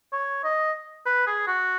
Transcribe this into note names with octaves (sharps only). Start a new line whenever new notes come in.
C#5
D#5
B4
G#4
F#4